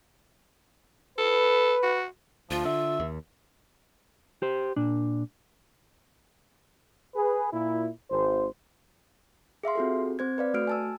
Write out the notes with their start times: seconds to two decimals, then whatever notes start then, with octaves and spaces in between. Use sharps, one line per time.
1.18 A4 B4
1.83 F#4
2.51 D2 F3 F4
2.65 D3 E5
3.00 D#2
4.42 G4 C5
4.76 A#2 D4
7.15 G#4 B4
7.52 A#2 E4
8.11 G#1 C5
9.63 G#4 E5 F5 C6
9.75 C4 F4 F#4 G#4 A4
10.19 C4 C5 G#6
10.38 B4 D5 F5
10.54 A3 F#4 F6 D7
10.67 G#5 A5 E6